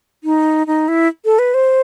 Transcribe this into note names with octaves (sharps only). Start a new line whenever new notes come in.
D#4
D#4
E4
A4
B4
C5